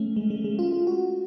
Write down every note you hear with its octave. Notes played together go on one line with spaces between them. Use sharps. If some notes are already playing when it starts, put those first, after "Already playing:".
Already playing: A3 C#4
G#3
G#3
G#3
F4
F4
F#4